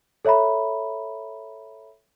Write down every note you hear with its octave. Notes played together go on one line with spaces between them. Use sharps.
A4 C#5 E5 A#5 B5